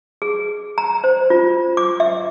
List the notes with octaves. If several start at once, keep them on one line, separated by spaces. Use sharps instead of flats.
G#4
A#5
C5
F4
D6
E5